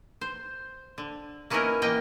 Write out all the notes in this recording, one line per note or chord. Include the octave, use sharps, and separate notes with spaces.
C5
D3
A#3 B3 C#4 D#4 E4 A#4
B2 E3 A#3 D#5 G5